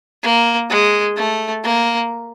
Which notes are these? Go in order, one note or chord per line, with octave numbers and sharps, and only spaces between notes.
A#3
G#3
A3
A#3